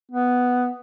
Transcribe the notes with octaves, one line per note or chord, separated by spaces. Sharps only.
B3